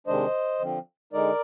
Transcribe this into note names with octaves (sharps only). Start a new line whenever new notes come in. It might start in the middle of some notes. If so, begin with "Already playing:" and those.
C3 D#3 G#3 D4 C5 D#5
D3 F3 C4
D3 G#3 D#4 A#4 D5